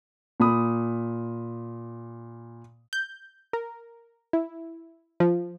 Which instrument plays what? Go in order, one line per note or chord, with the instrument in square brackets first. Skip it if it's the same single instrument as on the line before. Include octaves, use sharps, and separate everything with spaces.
[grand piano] A#2 B5 D#6
[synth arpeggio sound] G6
A#4
E4
F3